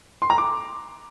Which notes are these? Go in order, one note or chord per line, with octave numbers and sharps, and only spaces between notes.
C6
A#5
D6